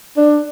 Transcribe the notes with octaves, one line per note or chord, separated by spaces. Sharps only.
D4